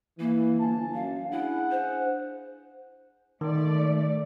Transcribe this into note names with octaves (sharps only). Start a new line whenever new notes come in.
E3 A#3
G1 G#5 A5
F#2 F5
D4 E4 G#4 F#5
C5
D#3 A3 D5